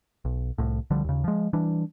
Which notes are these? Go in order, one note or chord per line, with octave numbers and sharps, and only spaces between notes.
B1
C2 A2
C2 D3 F3 G3
D#2 C#3
F3 G#3
E3 G3 D4